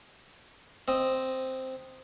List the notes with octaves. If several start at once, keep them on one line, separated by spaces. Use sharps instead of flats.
C4 D#5